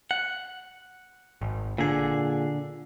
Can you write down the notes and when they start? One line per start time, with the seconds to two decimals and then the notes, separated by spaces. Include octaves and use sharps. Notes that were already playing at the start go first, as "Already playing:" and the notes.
0.11 F#5
1.41 G#1
1.78 A#2 D3 G#4